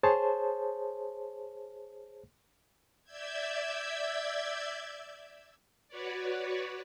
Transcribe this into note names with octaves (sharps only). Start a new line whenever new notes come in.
G#4 C5 C#5 A5
D5 E5 E6 G6 G#6
F#4 B4 C#5 D5